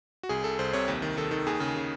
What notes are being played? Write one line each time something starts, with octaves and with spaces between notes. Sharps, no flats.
F#4
C2 G#4
C2 A4
C2 C5
C3 C#5
D#2
D#3
D#3 A4
D#3
D#2 G#4
C#3
C#3